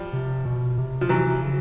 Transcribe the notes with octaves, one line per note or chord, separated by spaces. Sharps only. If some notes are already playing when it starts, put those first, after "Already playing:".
Already playing: F3 G3
C3
B2
C3
F3
C3 E3 F#3
C#3